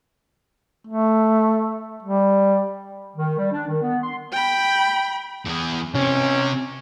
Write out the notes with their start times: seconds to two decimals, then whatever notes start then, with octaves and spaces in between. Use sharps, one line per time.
0.87 A3
2.03 G3
3.16 D#3
3.38 G3
3.52 D4
3.68 D#3
3.83 B3
4.03 C6
4.33 G5 B5
5.45 E2 G#4
5.95 C3 C#4